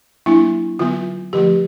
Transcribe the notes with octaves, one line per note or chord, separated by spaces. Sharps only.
F#3 A#3 D4 E4
D3 F#3 B3 F4
D3 F3 A3 G4